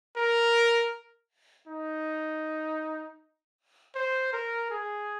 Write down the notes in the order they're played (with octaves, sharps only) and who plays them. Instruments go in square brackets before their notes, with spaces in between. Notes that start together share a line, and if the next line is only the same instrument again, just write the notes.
[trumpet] A#4
D#4
C5
A#4
G#4